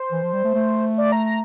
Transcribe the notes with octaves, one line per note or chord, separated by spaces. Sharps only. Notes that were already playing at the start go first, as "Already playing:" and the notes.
Already playing: C5
E3
F3
G3
A3
A3
D5
A#5
A#5